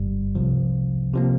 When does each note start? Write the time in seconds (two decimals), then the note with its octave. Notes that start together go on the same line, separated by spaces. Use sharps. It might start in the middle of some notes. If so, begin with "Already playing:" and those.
Already playing: G1 G2 G3
0.35 C2 C3 F3
1.13 C3 F3 A#3